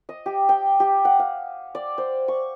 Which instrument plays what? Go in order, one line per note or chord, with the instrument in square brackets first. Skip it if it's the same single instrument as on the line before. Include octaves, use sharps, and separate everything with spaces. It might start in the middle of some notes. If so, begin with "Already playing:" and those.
[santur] D#5
G4
G5
G4
F#5
F5
D5
C5
C#6